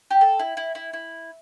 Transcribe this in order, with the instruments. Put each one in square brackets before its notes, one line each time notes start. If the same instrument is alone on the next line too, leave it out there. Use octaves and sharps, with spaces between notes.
[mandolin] G4
A4
E4
E4
E4
E4